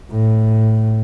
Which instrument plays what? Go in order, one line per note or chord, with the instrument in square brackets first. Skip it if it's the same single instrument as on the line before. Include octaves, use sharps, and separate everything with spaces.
[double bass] A2